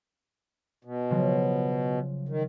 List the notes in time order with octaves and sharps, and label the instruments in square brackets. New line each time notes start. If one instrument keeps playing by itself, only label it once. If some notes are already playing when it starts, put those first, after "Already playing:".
[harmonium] B2
[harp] C#3 F3 F#3
[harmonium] D#3